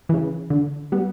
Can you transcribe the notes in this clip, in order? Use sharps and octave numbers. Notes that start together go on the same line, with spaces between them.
C#3 E3
D3
G3 B3